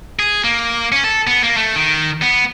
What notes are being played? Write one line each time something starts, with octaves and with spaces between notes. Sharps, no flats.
G#4
A#3
C#4
A4
B3
A#3
A3
D#3
B3